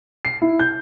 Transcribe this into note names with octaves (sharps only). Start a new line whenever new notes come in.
C7
E4
G6